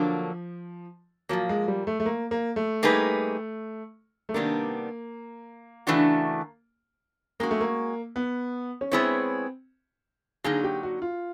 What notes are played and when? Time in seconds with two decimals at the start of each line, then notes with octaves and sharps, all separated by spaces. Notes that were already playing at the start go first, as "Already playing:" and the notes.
Already playing: D3 F3 F#3 A#3
1.29 A#2 F3 F#3 A#3
1.49 G#3
1.68 G3
1.87 A3
2.00 A3
2.06 A#3
2.31 A#3
2.56 A3
2.83 G3 A#3 D#4 G#4 B4
4.29 A3
4.34 C3 D#3 G3 A#3 B3 D4
5.87 C#3 E3 A3 D4 F#4
7.40 G#3 A#3 C#4 F#4
7.51 A3
7.61 A#3
8.16 B3
8.81 C#4
8.92 G#3 B3 C4 E4 G#4 C#5
10.44 D3 F#3 A#3 D#4 G#4
10.64 G4
10.83 F#4
11.02 F4